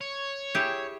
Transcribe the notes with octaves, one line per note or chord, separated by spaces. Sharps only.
C#5
E4 G4 G#4